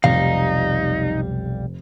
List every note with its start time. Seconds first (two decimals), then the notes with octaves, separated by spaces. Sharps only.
0.04 F1 B1 G3 D#4 F5